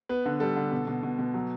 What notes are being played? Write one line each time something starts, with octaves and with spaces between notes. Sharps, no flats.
B3 B4
D3
G3 A4
D3
B2
B2
B2
B2
F#3